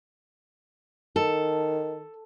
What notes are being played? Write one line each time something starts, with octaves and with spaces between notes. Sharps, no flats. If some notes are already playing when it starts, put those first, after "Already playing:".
D#3 A4